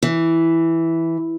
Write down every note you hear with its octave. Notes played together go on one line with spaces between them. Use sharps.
E3